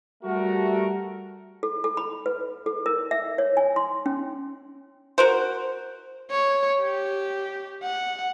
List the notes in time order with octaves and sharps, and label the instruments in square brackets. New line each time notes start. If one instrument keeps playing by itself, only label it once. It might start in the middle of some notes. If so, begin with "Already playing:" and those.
[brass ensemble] G3 A3 F#4 A#4
[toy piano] A4
A4
B5
B4
A4
A#4
E5
C#5
G#5
C6
C#4
[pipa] F#4 A#4 C5
[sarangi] C#5
G4
F#5